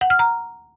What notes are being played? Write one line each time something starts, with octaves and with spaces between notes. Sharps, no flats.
F#5
F6
A#5